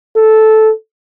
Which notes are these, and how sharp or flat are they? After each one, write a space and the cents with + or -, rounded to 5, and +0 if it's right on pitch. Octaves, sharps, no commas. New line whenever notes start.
A4 -10